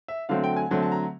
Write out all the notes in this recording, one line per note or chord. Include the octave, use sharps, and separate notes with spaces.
E5
D3 F#3 A3 C4 F5
G5
G#5
D3 F#3 A3 C4 A5
A5
A#5